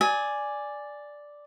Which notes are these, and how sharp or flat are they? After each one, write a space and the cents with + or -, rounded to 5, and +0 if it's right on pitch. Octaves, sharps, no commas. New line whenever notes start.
D5 +0 G#5 +0 D#6 +45